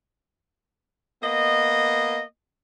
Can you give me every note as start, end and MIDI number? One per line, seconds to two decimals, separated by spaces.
1.23 2.21 58
1.23 2.21 59
1.23 2.21 75